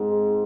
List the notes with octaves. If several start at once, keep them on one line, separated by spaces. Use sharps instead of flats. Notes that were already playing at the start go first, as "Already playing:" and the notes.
Already playing: G#2 G#3 C4